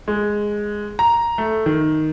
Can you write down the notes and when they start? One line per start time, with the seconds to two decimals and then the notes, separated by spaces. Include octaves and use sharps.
0.08 G#3
0.99 A#5
1.38 A3
1.66 D#3